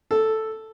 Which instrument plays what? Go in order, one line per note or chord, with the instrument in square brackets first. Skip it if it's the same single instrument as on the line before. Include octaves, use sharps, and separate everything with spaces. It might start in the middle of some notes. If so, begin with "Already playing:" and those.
[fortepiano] A4